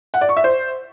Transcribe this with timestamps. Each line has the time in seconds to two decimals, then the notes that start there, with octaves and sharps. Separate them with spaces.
0.14 F#5
0.21 D5
0.29 C#6
0.36 E5
0.44 C5